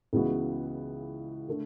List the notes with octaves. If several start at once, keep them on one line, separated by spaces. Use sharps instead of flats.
C#2 C#3 E3 B3 F#4
D3 A3